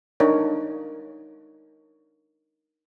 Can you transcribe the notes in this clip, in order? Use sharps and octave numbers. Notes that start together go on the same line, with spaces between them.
D4 D#4 A#4 C#5